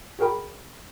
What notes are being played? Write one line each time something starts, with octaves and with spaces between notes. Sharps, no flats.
F#4 G#4 A#4 G5 B5